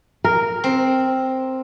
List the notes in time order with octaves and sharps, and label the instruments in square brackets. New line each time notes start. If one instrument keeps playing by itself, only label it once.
[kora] A#4
[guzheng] C4